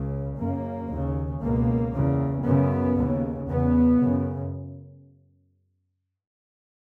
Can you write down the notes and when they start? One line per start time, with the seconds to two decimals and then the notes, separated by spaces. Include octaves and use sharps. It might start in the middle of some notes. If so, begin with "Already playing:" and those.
Already playing: C#2 C#3
0.38 F#2 C#3 A#3
0.90 D#2 C#3
1.42 C#2 B2 A#3
1.93 E2 C#3
2.45 F#2 C#3 B3
2.97 D#2 C#3
3.48 E2 C#3 B3
4.00 F#2 C#3